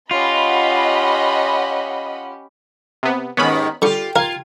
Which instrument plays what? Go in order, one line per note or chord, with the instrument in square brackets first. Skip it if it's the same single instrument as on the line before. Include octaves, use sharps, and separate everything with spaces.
[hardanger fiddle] C#4 G4 [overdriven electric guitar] F4 [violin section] D#5 F#5 B5
[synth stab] C3 B3
[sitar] D#2 G#2 D#3 [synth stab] B3 C#4 B5
[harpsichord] D3 C#6 [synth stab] G3 [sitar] F4 G4
[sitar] F4 [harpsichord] A#4 F5 [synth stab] G#6